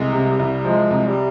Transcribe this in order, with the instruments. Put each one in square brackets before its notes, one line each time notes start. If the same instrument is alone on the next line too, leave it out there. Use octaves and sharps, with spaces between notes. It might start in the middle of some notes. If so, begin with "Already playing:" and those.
Already playing: [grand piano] C2 [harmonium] G#3
[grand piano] C3
[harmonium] G3
[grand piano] C2
[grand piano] F3 [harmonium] G#3
[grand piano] C2
[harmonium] G3